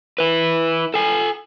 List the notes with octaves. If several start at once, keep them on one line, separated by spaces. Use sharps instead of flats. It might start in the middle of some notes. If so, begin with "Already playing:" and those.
E4 B4
A4 G#5